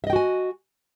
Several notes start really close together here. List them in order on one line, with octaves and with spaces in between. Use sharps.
E5 D#5 G5 F#4 G#5